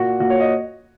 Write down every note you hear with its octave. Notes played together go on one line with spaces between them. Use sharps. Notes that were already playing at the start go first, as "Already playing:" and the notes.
Already playing: A#2 A#3 F#4
A#2 A#3 F#4
C#5
D#5